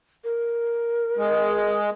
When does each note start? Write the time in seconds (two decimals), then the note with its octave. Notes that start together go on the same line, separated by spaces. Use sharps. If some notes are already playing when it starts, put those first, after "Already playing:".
0.24 A#4
1.18 G#3